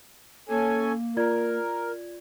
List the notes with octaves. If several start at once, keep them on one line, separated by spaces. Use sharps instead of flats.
A#3 C#4 A4 G#5
F4 A#4 D5 G#6